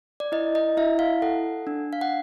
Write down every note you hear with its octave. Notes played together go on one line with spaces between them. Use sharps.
D5
E4 D#5
D#5
E4 E5
F5
A4 F#5
D4
F5
F#5